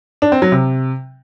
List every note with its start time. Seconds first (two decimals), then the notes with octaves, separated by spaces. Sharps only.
0.22 D4
0.32 C4
0.42 F#3
0.52 C3